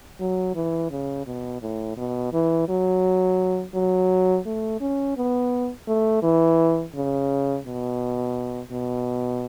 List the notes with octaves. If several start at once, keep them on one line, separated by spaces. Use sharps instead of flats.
F#3
E3
C#3
B2
A2
B2
E3
F#3
F#3
A3
C#4
B3
A3
E3
C#3
B2
B2